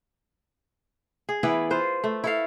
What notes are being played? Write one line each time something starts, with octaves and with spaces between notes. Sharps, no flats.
G#4
E3 B3 E4 B4
F4 B4 C5
A3
E4 A4 F5